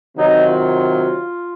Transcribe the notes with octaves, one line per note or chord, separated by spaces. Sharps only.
C3 D#3 F#3 D#4
F4